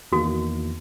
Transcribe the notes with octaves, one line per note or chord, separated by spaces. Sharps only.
E2 D#3 A#3 F#4